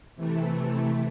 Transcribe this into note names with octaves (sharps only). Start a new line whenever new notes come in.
C3 E3 A3